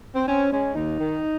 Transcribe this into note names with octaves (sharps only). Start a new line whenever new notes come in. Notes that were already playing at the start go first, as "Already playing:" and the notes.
C4
C4 C#4
G#3 C#4
D#2 D#4
D#3